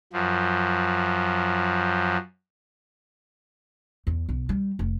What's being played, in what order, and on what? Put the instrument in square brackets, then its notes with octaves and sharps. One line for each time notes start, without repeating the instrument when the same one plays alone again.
[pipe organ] F#2 F3
[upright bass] E2
B1
G3
F1